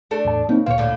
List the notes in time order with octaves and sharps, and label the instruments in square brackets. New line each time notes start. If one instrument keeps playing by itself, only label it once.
[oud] A3 D4 A4
[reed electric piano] E2 A2 A5
[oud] C#3 [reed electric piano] A#3 C4 D#4
[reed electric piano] D2 A#2 F5 [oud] C4 C#5
[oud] A2 D3